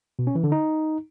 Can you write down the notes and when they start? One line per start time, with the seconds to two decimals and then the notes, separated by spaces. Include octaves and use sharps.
0.19 B2
0.27 C#4
0.35 E3
0.44 D3
0.52 D#4